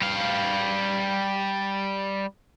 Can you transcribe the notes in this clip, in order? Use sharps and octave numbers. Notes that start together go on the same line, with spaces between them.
G3 F5